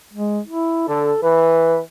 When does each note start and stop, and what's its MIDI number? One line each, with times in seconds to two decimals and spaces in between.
0.14 0.40 56
0.48 0.87 64
0.88 1.12 50
0.88 1.22 69
1.23 1.81 52
1.23 1.78 71